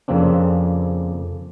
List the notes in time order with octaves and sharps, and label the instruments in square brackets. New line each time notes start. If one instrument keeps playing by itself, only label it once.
[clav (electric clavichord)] F2 C#3 A#3 C4 D4